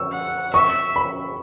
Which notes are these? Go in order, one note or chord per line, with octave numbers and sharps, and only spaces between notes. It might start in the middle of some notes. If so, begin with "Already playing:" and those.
Already playing: C#6 E6
F#5
E5 C#6
B5